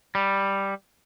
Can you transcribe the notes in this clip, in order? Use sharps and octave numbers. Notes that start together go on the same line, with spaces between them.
G3